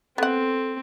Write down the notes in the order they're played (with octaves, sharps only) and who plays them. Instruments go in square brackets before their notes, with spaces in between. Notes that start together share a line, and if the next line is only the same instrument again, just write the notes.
[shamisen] B3 F#5 [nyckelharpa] C4 [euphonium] A4